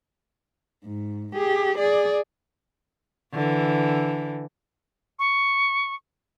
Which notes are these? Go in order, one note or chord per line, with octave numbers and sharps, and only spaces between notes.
G#2
G4 G#4
G#4 D5
D3 E3
C#6